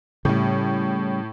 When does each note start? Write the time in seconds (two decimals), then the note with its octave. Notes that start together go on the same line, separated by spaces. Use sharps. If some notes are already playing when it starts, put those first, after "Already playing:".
0.25 A2 C#3 G3